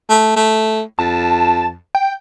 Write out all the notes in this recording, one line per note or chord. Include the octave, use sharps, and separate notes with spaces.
A3
A3
F2 A5
G5